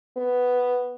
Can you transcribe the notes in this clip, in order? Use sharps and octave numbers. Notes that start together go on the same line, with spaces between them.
B3